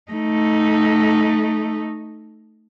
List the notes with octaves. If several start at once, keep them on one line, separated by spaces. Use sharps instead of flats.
A3 D#4